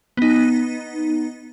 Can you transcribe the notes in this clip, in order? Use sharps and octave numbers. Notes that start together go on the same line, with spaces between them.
B3 D#4